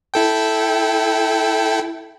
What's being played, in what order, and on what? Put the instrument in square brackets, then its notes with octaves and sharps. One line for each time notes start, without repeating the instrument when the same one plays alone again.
[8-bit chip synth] E4 A4 G5